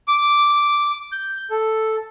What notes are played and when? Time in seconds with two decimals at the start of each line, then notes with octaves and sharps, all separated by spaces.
0.08 D6
1.12 G6
1.50 A4